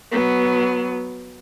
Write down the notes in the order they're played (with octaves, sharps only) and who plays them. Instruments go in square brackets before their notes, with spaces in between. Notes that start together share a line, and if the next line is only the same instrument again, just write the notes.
[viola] F#3 B3